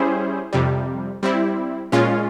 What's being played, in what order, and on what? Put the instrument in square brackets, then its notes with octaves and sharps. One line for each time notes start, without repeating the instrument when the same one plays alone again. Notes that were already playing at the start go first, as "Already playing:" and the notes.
Already playing: [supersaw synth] G3 C#4 E4 G#4 C5
F2 C3 G3
G3 C4 E4
A#2 G#3 C#4 F4